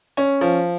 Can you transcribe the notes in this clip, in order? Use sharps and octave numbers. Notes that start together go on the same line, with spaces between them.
C#4
F3